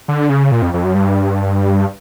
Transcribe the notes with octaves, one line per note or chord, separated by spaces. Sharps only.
D3
C#3
A#2
F2
F2
F#2
G2